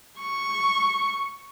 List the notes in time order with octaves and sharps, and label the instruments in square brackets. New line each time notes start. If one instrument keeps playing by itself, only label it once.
[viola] C#6